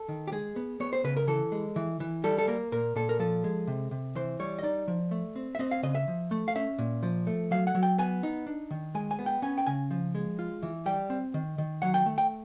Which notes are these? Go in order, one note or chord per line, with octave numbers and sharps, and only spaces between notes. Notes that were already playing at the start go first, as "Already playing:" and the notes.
Already playing: A4
D#3
G4
G#3 G#4
B3
B3 C#5
C5
C#3 B4
A#4
E3 A4
G#3
E3
E3
G3 A4
A4
A#3 A#4
A#2 A#4
A#2 A4
A#4
F3 A4
G#3
C3
C3
E3 C5
G3 C#5
D#5
D#4 D5
F3
A3
C4
E5
C4 D#5
F5
C#3 D#5
E5
F3
A3
F5
C#4 E5
A#2
F3
A3
F#3 F5
F#5
F#3
G5
B3 G#5
D#4
D4
D#3
G#3 G#5
G#5
B3
G5
C#4 G#5
G5
C#3 G#5
F3
G#3
F4
E3
G3 G5
C4
D#3
D#3
F#3 F#5
G5
A3
G5